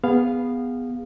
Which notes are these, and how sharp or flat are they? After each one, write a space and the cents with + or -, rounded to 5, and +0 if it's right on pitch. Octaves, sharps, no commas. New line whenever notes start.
B3 +0 G#4 -25 F5 +0